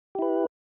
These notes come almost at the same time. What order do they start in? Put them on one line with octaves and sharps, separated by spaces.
G4 E4 B4